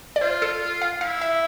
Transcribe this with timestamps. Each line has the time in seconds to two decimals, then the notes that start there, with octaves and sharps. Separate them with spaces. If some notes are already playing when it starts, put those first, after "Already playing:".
0.16 D5
0.21 F4 C5
0.42 A4
0.82 F5
1.01 E4 F5
1.21 E5